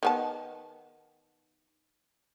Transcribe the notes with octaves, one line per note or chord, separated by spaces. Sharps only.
D#3 B3 A5